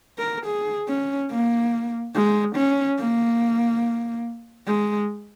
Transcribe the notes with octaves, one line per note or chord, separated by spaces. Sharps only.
A#4
G#4
C#4
A#3
G#3
C#4
A#3
G#3